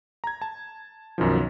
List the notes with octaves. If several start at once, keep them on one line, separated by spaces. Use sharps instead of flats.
A#5 G#6
A5
B1 F#2 D#3 F3